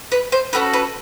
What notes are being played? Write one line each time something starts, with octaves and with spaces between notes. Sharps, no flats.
B4
C5
C#4 F#4 A4 B4
B4